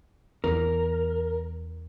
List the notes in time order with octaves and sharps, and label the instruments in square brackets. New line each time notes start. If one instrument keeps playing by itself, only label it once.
[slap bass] E2 E3 [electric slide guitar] A#4